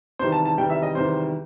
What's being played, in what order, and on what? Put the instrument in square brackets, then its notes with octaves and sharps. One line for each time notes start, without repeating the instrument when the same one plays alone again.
[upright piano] E2 C3 D#3 G3 C5
A5
A5
E2 C3 D#3 G3 G5
E5
D#5
E2 C3 D#3 G3 C5